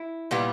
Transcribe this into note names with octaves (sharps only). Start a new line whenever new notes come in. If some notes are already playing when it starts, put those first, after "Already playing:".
Already playing: E4
A#2 G3 B3